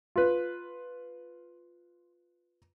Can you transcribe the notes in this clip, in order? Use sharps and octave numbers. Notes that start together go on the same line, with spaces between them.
F4 B4